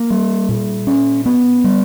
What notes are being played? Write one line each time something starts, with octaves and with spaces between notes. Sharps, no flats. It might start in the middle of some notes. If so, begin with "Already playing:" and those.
Already playing: A#3
G3
A#2
C#4
B3
G3